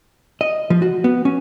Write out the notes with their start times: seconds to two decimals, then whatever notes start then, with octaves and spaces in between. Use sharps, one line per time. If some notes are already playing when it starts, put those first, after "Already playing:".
0.41 D#5
0.70 F3
0.82 F#4
1.04 B3
1.25 C#4